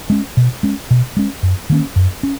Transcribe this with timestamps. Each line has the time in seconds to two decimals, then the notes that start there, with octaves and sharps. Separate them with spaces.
0.10 G#3 C#4
0.37 B2
0.63 G#3 C#4
0.91 B2
1.17 G#3 C#4
1.43 F#2
1.70 D#3 A#3 C#4
1.96 F#2
2.23 C#4